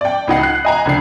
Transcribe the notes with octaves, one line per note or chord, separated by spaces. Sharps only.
D5 G5
C#2 D#4 F#5 C7
F#6
D#5 G#5 A#5
C#2 D3 C7